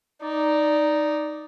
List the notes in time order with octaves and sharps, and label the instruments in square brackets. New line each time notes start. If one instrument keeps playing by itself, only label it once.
[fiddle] D#4 [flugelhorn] D5